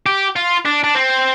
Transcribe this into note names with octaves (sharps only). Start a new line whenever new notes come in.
G4
F4
D4
D4
C4